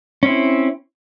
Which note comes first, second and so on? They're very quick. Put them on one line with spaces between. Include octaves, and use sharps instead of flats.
C#4 C4 E4